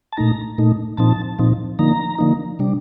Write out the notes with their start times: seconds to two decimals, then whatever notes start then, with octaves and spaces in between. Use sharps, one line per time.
0.12 A5
0.17 A#2 A3 D#4 A#5
0.58 A#2 A3 D#4
0.97 A#2 F3 C4 D#4 A5
1.39 A#2 F3 C4 D#4
1.79 D3 F3 A#3 D#4 A#5
2.19 D3 F3 A#3 D#4
2.59 C3 G3 D4